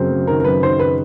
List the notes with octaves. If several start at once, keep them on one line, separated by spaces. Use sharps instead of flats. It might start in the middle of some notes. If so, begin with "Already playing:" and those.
Already playing: F#2 C#3 C4
F#2
D#3 A#4
A#4
F#2 B4
D#3 C5
B4